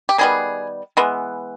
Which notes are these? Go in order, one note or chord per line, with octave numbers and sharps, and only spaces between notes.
G4
D#3 G3 B3 G#4
E3 G#3 B3